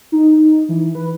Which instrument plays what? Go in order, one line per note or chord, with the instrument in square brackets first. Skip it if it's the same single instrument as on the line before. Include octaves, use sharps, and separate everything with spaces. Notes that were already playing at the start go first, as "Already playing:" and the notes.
[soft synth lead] D#4
E3
B4